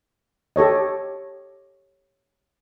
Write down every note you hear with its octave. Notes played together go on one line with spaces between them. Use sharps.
G4 A4 C#5 D#5